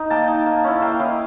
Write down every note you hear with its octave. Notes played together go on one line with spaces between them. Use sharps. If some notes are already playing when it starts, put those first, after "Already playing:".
Already playing: D#4
A#3 G5 A5
D#4
A#3
C#4 E4
A#3 F5 G5
C#4 E4 D#5 F5